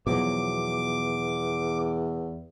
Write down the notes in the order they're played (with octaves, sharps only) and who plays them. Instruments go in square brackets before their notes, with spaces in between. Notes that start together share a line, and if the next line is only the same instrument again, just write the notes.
[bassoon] E2 [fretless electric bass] B2 F3 F#3 [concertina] D6